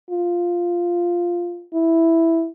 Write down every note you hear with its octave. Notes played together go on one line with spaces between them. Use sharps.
F4
E4